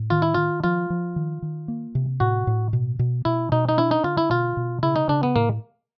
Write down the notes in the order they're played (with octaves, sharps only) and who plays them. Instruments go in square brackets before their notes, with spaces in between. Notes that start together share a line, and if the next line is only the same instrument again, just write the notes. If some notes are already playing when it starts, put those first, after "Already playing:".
Already playing: [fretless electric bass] A2
[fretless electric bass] D#3 [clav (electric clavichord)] F4
[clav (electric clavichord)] E4
[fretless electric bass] D#3 [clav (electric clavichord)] F4
[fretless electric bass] F3 [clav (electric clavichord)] F4
[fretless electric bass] F3
D#3
D#3
A#3
C3
[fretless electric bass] A2 [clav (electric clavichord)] F#4
[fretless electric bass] A2
B2
B2
[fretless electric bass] B2 [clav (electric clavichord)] E4
[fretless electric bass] B2 [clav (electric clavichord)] D#4
[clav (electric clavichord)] D#4
[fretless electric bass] D4 [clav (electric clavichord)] E4
[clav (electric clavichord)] D#4
[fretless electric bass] D3 [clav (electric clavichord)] F4
[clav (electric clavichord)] E4
[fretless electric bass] B2 [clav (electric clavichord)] F4
[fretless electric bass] B2
[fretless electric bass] C#3 [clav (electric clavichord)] E4
[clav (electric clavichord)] D#4
[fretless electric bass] C#3 [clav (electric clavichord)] D4
[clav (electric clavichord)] B3
[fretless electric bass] A2 [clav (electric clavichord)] A#3